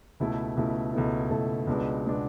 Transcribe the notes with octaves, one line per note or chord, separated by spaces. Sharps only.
C#2 B2 A3 E4 A4
C#2 B2 A3 E4 A4
C#2 B2 A3 E4 A4
C#2 B2 A3 E4 A4
C#2 B2 G#3 B3 D4
B2 G#3 B3 D4